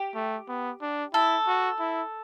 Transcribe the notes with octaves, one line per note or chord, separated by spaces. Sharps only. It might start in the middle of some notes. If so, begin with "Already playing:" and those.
Already playing: G4
A3
B3
D4
E4 A4
F#4
E4